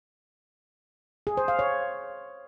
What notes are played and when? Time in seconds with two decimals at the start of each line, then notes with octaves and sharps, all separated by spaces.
1.27 G#4
1.37 C5
1.48 F5
1.59 C#5